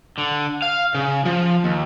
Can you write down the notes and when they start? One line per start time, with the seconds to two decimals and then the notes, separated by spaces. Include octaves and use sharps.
0.18 D3
0.62 F5
0.95 C#3
1.26 F3
1.65 D#2